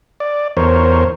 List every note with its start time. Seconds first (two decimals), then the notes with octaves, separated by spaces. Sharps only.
0.20 D5
0.57 E2 A#4 C5 C#5